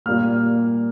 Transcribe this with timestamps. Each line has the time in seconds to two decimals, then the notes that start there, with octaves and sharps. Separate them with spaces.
0.06 A#2 G3 A#3 F6